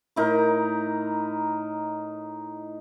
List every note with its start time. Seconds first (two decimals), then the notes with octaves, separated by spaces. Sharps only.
0.16 A2 D#4 A#4